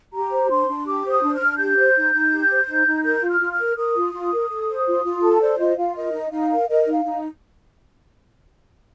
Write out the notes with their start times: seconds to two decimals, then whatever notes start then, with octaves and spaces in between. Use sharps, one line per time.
0.13 G4 A#5
0.31 C5
0.50 D4 C6
0.68 D4
0.86 G4 D6
1.04 C5
1.10 D#6
1.22 D4
1.35 F6
1.41 D4
1.59 G4 G6
1.77 C5
1.95 D#4
2.14 D#4
2.31 G4
2.50 C5
2.68 D#4
2.86 D#4
3.04 A#4 G6
3.22 F4
3.28 F6
3.41 F4
3.52 F6
3.59 A#4
3.77 A#4 D#6
3.96 F4
4.13 F4
4.32 A#4
4.49 A4
4.68 C5
4.87 F4
5.04 F4
5.22 A4 A5
5.41 C5 D5
5.59 F4 D#5
5.77 F4 F5
5.95 A#4 D#5
6.13 D#4
6.31 D#4 F5
6.50 A#4
6.68 A#4 D#5
6.87 D#4 F5
7.04 D#4